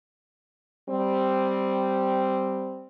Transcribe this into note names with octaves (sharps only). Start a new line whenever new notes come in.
G3 C4